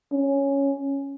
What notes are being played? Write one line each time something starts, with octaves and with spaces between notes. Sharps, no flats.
C#4